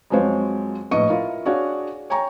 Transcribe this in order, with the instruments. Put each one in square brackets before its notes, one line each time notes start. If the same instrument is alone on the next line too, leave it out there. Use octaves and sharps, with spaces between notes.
[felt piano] F2 F#3 G#3 F4 C5 C#5
A#1 A2 B4 D#5 C#6 C#7
E4 F4 A#4
D4 F#4 G#4 C#5 D5 F5
C#5 G5 G#5 A#5 C#6